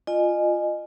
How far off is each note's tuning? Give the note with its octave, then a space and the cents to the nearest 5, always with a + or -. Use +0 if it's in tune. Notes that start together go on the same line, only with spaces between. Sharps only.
F4 +0 D#5 -30 G#5 +5